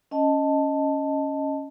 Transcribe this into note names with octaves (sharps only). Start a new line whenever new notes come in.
C#4 D#5 G5 A5